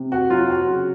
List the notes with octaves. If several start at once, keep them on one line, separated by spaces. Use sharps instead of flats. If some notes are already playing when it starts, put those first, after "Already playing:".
Already playing: C3
F#4
F#3 F4
F#4
C#3